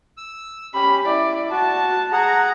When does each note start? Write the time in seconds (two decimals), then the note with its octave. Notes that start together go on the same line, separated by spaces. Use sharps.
0.17 E6
0.74 C#4 G4 B5
1.05 E4 D5
1.51 F#4 A5
2.12 G#4 F#5 A#5